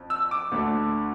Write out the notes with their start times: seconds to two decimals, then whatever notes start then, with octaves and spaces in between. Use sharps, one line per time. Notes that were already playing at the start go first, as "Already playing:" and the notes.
Already playing: F2
0.10 E6
0.31 D6
0.51 D2 D3 A3